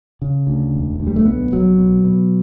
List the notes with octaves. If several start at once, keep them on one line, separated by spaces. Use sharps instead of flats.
C#3
D2
E1
D2
G3
A3
B1 B3
B2 F#3
B2
B2